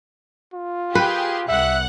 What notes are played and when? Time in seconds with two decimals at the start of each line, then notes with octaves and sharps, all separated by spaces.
0.54 F4
0.95 G4 G#4 B4
1.49 C2 E5 F#5 F#6